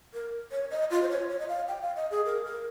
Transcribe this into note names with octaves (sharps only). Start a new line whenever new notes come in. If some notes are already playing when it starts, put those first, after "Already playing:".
A#4
C#5
D#5
F4
C5
C#5
C#5
D#5
F5
G5
F5
D#5
G#4
A#4
A#4